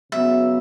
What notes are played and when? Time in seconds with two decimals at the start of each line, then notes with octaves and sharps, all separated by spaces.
0.12 C#3 F#3 B3 E5